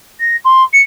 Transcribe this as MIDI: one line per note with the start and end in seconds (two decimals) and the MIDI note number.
0.20 0.36 94
0.44 0.63 84
0.73 0.81 97